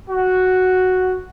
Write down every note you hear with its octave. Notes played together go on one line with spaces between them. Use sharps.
F#4